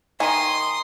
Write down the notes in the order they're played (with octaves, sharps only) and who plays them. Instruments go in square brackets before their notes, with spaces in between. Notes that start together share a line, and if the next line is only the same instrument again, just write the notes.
[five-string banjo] D#3 G#5 [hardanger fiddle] C6 D#6